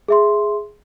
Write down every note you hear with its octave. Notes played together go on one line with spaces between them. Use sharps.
G#4 E5 C6